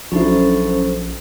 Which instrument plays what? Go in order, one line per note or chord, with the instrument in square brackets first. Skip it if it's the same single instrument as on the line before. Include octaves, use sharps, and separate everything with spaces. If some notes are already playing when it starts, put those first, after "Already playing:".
[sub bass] A#1 [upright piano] F#3 D4 E4 [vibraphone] C#4 A4 C5